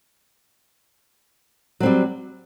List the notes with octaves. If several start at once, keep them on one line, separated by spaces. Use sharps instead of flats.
F#3 G3 C4